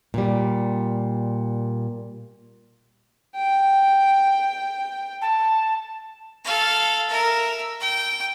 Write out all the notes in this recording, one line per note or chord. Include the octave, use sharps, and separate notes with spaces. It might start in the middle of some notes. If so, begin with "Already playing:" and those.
A#2 G3
G5
A5
A4 F5
A#4 E5
G5